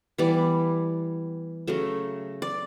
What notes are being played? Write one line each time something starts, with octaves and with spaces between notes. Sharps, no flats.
E3 G3 B3 D5
C#3 F#3 A3
D5